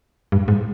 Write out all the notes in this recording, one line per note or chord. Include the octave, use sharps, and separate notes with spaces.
G2
G#2